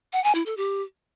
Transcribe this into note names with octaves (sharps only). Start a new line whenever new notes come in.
F#5
G#5
E4
A4
G4